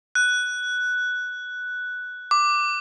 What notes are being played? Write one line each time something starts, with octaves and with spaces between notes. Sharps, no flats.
F#6
D6